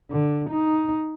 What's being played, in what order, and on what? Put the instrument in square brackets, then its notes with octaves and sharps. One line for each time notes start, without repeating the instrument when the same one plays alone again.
[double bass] D3
D#4